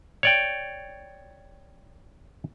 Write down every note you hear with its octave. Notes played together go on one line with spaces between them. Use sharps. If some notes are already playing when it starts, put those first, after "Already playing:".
C#5 D5 G5